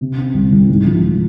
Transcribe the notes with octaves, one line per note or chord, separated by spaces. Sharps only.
C3
C4
C2
C2
G#2
F3